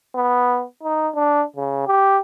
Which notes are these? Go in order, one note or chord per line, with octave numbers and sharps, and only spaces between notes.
B3
D#4
D4
C#3
G4